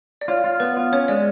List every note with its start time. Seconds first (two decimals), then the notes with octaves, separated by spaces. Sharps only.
0.21 D5
0.28 F4 C#5
0.44 F4
0.60 B3 B4
0.77 F4
0.93 C#4 C#5
1.08 G#3 D5